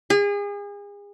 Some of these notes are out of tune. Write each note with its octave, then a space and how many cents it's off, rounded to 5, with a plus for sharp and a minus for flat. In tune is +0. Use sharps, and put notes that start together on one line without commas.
G#4 -35